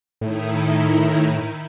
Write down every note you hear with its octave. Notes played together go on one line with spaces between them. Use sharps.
A2 D#3 D#4 E4